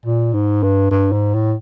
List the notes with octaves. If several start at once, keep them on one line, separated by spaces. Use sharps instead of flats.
A#2
G#2
G2
G2
G#2
A2